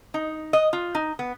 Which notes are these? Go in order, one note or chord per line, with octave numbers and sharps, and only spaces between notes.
D#4
D#5
F4
D#4
B3